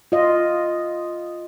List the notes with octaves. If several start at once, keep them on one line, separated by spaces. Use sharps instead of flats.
F4 D#5